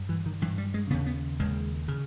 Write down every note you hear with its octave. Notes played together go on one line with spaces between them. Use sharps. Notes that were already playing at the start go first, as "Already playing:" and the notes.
Already playing: G2
E3
D#3
G2 E3
G3
G#3
D#2 C#3 B3
B3
D#2 C#3 G#3
C#3